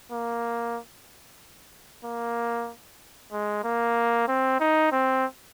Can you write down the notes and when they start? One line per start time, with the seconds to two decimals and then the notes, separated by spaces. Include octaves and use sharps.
0.12 A#3
2.04 A#3
3.32 G#3
3.64 A#3
4.28 C4
4.60 D#4
4.92 C4